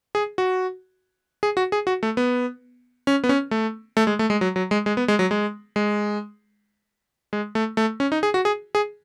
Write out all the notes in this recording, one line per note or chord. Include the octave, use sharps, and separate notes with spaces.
G#4
F#4
G#4
F#4
G#4
F#4
A3
B3
C#4
B3
C#4
A3
A3
G#3
A3
G#3
F#3
F#3
G#3
G#3
B3
G#3
F#3
G#3
G#3
G#3
A3
A3
C#4
D#4
G#4
F#4
G#4
G#4